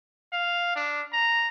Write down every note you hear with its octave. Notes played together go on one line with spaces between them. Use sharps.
F5
D4
A#5